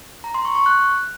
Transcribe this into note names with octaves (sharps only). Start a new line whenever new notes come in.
A#5
C6
C#6
C#6
F#6